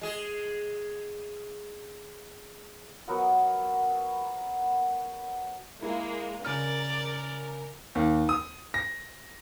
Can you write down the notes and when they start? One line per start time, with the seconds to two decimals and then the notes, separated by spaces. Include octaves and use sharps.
0.01 G#3 G#4
3.08 F#3 B3 A#4 F#5
5.82 G#3 A#3 E4
6.45 C#3 A#4 D5 F6
7.95 D#2
8.29 D#6
8.74 A#6